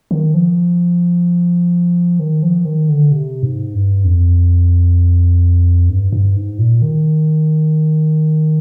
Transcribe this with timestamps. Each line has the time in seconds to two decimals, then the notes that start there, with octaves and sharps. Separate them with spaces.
0.11 D#3
0.34 F3
2.19 D#3
2.43 F3
2.65 D#3
2.89 D3
3.12 C3
3.43 G#2
3.74 G2
4.04 F2
5.89 G2
6.12 G2
6.36 G#2
6.58 A#2
6.82 D#3